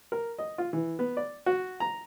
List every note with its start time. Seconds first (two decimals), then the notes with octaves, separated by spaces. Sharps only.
0.12 A#4
0.38 D#5
0.58 F4
0.73 E3
0.99 B3
1.17 D5
1.46 F#4
1.80 A#5